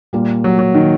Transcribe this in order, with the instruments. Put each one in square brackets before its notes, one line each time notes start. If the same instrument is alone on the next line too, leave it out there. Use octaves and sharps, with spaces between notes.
[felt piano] A#2 G3 A#3
[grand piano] F#3
F#3
D#3